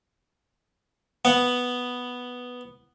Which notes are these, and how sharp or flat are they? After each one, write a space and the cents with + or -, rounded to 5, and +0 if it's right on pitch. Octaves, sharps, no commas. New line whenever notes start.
B3 +0 F#5 +0